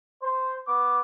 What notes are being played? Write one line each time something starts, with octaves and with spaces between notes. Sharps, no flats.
C5
B3 D6